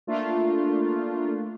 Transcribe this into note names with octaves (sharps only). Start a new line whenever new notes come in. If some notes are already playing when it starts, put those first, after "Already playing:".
A3 A#3 D4 F4